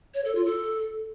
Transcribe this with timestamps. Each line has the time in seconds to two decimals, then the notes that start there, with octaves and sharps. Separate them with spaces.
0.14 C#5
0.25 A4
0.35 F4
0.45 A4